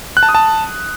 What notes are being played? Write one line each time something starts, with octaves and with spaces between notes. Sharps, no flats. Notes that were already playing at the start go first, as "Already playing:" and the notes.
F#6
A5
D#6
A5